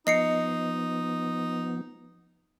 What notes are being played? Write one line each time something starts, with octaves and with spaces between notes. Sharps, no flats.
F3 B3 D#4 D#5 C7 C#7